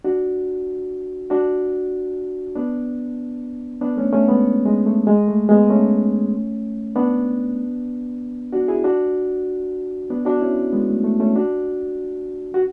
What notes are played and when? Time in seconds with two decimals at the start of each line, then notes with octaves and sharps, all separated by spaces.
0.04 D4 F#4
1.30 D4 F#4
2.55 B3 D4
3.81 B3 D4
3.97 A3 C#4
4.13 A3 C#4
4.28 G#3 B3
4.65 G#3
4.86 A3
5.07 G#3
5.28 A3
5.49 G#3 B3
5.70 A3 C#4
6.96 B3 D4
8.53 D4 F#4
8.68 E4 G#4
8.84 D4 F#4
10.10 B3 D4
10.25 D4 F#4
10.41 C#4 E4
10.72 G#3 B3
10.89 A3
11.04 A3
11.19 A3 C#4
11.35 D4 F#4
12.54 F#4